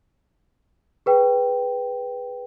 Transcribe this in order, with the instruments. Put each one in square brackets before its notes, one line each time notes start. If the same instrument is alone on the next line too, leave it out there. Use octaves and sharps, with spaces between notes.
[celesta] G#4 B4 G5